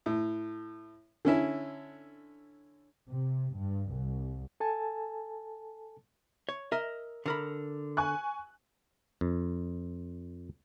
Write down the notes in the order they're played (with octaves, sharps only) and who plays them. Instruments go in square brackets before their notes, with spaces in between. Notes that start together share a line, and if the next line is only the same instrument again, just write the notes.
[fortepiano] A2
D3 C#4 E4
[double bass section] C3
G2
C2
[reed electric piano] A4 G#5 A5
[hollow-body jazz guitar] C#5
A#4 D#5 E5
D3 A#4 B5
[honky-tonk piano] G#5 C#6 F#6
[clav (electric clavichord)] F2